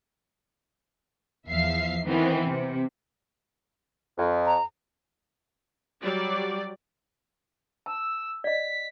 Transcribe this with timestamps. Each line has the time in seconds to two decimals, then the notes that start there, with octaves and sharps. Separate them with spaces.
1.48 E2 F3 E5 F5 C7
2.05 D#3 E3 B3 C4
2.46 C3
4.18 F2
4.46 A#5
6.02 F#3 G3 D5
7.86 A5 E6
8.44 D5 D#5 B6